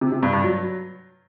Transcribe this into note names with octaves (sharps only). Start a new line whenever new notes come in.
C3
C3
G2
G2
F#3